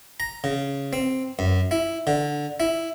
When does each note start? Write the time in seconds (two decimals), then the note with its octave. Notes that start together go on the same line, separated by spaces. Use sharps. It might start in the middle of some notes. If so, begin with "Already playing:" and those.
0.20 A#5
0.44 C#3
0.93 C4
1.39 F#2
1.71 E4
2.07 D3
2.60 E4